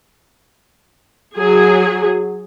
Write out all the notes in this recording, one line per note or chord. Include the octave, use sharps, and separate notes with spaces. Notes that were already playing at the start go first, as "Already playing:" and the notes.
F#3 G#4